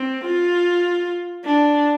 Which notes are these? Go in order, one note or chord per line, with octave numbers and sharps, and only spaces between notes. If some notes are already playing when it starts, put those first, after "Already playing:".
Already playing: C4
F4
D4